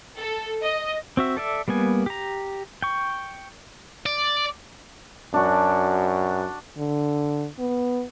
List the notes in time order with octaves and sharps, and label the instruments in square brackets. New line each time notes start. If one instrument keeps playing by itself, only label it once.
[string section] A4
D#5
[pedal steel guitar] C4 F#4 E5
A4 D5 E5
G3 A#3 B3 G#5
G4 A#5
G5 C#6
[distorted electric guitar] D5
[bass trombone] F#2 [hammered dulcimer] D4 F#4
[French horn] D3
B3